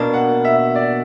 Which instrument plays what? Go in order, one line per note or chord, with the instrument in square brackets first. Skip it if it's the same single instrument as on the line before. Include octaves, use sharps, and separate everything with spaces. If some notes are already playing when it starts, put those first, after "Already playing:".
Already playing: [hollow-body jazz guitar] B2 A#3 D4
[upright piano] F#5
E5
D5